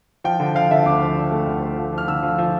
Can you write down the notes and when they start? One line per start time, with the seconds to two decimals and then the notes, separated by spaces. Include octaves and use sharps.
0.24 F3 G5
0.40 D3
0.55 F3 F5
0.71 D3 E5
0.86 D2 D6
1.01 F3
1.17 D3
1.32 A3
1.47 D2
1.62 A3
1.78 F3
1.93 F3
1.98 F6
2.08 D3 E6
2.23 F3
2.38 F3